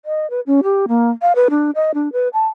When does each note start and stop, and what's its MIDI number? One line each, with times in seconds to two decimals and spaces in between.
0.05 0.29 75
0.30 0.40 71
0.47 0.60 61
0.63 0.86 67
0.88 1.11 58
1.22 1.35 77
1.35 1.48 71
1.50 1.71 62
1.75 1.92 75
1.94 2.12 62
2.13 2.28 71
2.33 2.47 81